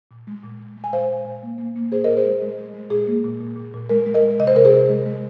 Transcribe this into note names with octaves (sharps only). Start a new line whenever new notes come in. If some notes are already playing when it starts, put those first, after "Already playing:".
A#2
G#3
A#2
A#2
G#3
G#5
A#2 C5 F5
A#2
A#2
A#3
A#3
A#3
A#2 G#4 C5
A#2 A#4 D#5
G#4 C5
G#3
G#3
G#3
G#3
A#2 G#4
A#3
A#2
A#2
A#2
A#2
G#3 A#4
G#3
A#4 D#5
G#3
C3 D#5
C5
C3 A#4
G#4 C5
C3
G#3
G#3